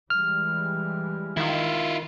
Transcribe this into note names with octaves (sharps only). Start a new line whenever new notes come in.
E3 G3 G#3 F6
D#3 E4 F4